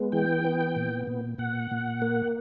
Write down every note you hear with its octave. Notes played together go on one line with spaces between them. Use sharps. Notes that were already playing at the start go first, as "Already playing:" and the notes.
Already playing: G#3 B3
E3 G5
B3
A#2
A#2
A#2 F#5
A#2
A#3